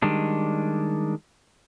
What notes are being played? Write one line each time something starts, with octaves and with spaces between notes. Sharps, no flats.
D#3 G3 G#3 D4